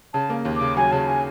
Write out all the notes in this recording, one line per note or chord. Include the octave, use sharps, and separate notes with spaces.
C#3 A5
A#3
D#2
D6
C#3
F#3 G#5
C#3 A5
G#5